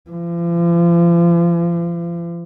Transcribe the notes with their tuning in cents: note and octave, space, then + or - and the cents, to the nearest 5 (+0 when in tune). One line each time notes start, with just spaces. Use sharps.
F3 -40